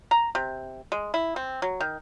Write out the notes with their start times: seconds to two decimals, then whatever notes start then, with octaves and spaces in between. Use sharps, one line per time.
0.11 A#5
0.35 C3
0.92 G#3
1.14 E4
1.36 C4
1.62 F#3
1.80 D#3